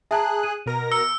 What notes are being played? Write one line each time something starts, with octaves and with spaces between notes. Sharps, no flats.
G#4 E5 A5 A#5 F#6
D#7
B2 A#4 A#6
E6 C#7